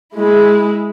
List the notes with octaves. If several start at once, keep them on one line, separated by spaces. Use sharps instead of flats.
G#3 E4